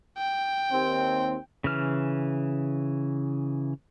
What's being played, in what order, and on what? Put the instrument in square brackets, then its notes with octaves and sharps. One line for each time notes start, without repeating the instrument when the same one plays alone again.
[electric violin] G5
[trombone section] D#2 C4
[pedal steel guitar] C#3 E3 F6